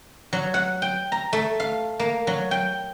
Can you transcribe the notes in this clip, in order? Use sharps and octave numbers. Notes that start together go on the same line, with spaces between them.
F#3
F#5
G5
A#5
A3
F5
A#3
F#3
G5